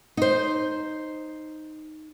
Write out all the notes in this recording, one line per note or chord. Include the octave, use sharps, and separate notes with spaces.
D#4 C5